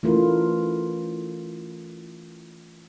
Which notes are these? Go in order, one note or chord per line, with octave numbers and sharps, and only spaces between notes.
E3 A3 C#4 E4 F4 A#4